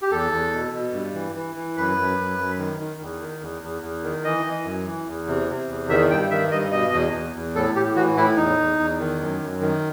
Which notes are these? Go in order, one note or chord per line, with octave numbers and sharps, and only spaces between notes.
G4
E2 A4
E2
B2
B2
G2
E3
E3
E3
F#2 B4
F#2
F#2
F#2
D#3
D#3
E2
D#3
E2
E2
E2
D#3
E3 D#5
E3
F#2
E3
E2
C3
C3
E2
D#3 E5
G2 G5
D#3 E5
G2 D#5
B2 D#5
E2
E2
E2
A2 A4
A2 G4
E3 F#4
A2 E4
E2 D#4
E2
E2
D#3
F#2
F#2
D#3